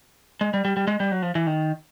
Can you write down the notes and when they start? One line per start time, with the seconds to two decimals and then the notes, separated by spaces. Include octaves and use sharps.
0.41 G#3
0.54 G3
0.65 G3
0.77 G3
0.87 G#3
1.00 G3
1.12 F#3
1.22 F3
1.35 E3
1.47 D#3